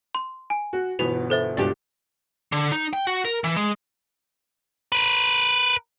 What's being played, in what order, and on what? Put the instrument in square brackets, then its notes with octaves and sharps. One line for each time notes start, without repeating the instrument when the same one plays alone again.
[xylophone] C6
G#5
[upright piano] F#4
[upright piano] G1 B2 E3 [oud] B3 [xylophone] F7
[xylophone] A4 C5 E5
[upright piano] C#2 G2 B2 [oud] D4 G4
[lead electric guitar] D3
D#4
G5
F#4
A#4
E3
G#3
A#4 B4